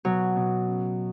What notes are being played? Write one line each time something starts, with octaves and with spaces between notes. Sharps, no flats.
B2 F#3
B2
C#3